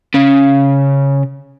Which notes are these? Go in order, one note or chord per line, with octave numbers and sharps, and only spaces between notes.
C#3